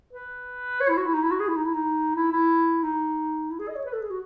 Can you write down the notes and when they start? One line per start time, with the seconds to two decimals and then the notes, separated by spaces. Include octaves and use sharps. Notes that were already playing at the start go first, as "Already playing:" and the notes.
0.13 B4
0.81 C#5
0.89 E4
0.97 F#4
1.06 E4
1.14 D#4
1.23 E4
1.31 F#4
1.40 G#4
1.48 E4
1.56 D#4
1.65 E4
1.74 D#4
2.16 E4
2.32 E4
2.83 D#4
3.51 E4
3.59 G#4
3.68 D#5
3.76 C#5
3.85 B4
3.93 A4
4.02 G#4
4.10 F#4